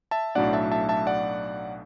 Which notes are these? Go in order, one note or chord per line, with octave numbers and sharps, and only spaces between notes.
E5 A5
B1 A2 F#3 A3 D4 D5 F#5
E5 A5
E5 A5
E5 A5
D5 F#5